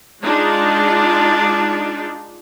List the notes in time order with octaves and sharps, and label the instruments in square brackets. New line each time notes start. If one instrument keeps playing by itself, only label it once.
[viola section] G#3 D4 D#4 F4